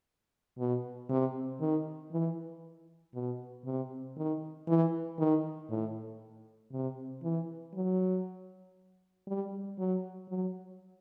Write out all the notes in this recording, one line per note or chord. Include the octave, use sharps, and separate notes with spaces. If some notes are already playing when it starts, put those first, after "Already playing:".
B2
C3
D#3
E3
B2
C3
D#3
E3
D#3
A2
C3
E3
F#3
G3
F#3
F#3